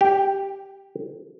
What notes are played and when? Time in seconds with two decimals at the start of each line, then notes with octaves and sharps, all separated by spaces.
0.01 G4